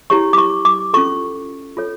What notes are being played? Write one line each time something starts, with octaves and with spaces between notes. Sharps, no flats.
E4 G4 C#5 C#6
D6
C#6
D6
C#4 F4 A4 C#6
F4 A4 C#5